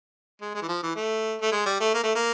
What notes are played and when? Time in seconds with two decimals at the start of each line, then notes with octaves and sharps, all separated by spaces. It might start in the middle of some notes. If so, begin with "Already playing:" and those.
0.41 G#3
0.55 G#3
0.62 E3
0.68 F3
0.83 E3
0.96 A3
1.42 A3
1.52 G#3
1.66 G3
1.80 A3
1.94 A#3
2.04 A3
2.15 A#3